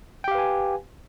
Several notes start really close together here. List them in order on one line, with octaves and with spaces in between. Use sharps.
G5 G4 F5 B4 G#5